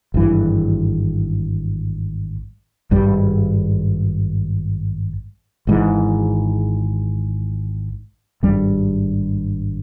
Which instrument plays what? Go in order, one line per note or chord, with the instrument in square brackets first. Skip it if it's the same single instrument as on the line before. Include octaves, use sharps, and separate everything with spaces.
[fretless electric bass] G#1 G2 E3
G#1 G2 G3
G#1 G#2 E3
G#1 G2 G3